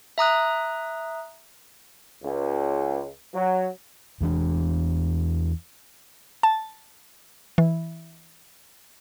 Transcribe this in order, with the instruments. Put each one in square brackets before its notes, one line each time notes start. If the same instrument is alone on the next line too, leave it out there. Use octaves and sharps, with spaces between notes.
[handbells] E5 A#5 D#6 F#6
[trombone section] C#2
F#3
[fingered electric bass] E2 E3 D4
[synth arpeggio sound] A5
E3